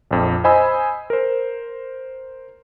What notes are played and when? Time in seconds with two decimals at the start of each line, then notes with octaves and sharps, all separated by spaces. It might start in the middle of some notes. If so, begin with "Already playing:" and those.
0.11 A#1 F2
0.44 C5 D#5 G#5 B5 D#6 E6
1.10 A#4 C5